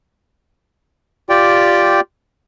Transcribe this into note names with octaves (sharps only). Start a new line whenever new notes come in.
F4 G4 D5 G5